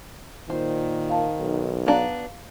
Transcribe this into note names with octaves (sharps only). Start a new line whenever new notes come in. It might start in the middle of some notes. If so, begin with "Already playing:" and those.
A#2 D#3 C5
F5 A5
B1
B3 D4 F#4 F5 A#5